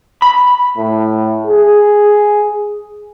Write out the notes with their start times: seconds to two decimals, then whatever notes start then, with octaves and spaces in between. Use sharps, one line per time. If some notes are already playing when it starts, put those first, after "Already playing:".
0.22 B5
0.77 A2
1.47 G#4